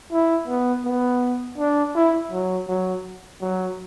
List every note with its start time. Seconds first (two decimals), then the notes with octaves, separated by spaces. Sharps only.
0.12 E4
0.48 B3
0.85 B3
1.58 D4
1.95 E4
2.32 F#3
2.68 F#3
3.41 F#3